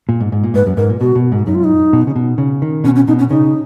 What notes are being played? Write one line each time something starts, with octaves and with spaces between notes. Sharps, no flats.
A#2
G#2
G#2
A#2
G#2 B4
F#2
G#2 A#4
A#2
B2 F#4
B2
G#2
F#2 D#4
F4
D#4
B2
C#3
B2
C#3
D#3
B2 C#4
C#4
B2 D#4
C#4
C#3 D#4